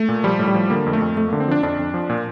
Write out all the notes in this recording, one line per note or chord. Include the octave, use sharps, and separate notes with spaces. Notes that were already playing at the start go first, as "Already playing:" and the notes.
Already playing: A3
A#2
F3 G3
A2
G3
F3
D3 A#3
F2
A3
F2
F2 A3
D3 A#3
C4
F3 D4
F2 D4
F2
F3
A#2